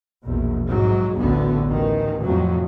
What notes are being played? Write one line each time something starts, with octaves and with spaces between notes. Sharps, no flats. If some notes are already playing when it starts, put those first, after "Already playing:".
A#1 E2 B2
G#2 C3 F#3
A1 D2 D3 B3
A1 D#3
F2 A2 C3 F#3